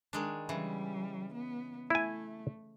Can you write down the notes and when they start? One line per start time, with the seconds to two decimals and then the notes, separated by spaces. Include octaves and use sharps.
0.13 D#3 G#3 D4
0.49 C#3 E3 G3
1.35 B3
1.90 A3 E4 G#5